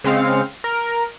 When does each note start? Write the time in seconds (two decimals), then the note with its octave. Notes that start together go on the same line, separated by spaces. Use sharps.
0.04 C#3 G#3 C4 F5 C#7
0.64 A#4